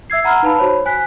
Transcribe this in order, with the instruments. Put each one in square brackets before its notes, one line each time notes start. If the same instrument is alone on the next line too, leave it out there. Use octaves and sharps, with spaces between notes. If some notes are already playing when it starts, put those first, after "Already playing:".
[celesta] E5 E6 G#6 C7
F#5 A#5 B5 E6 F6
D#4 B4 F5 A5 B5
F#4 C5 C#5 B5
G#5 F#6 B6